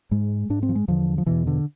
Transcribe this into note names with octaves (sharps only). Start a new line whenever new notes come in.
G#2 G#3
G#2 D4
C4
F3
G#3
E2 D3 F3
F3
E2 B2 E3
D3